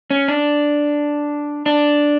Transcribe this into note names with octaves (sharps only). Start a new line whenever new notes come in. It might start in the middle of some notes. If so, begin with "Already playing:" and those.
C#4
D4
D4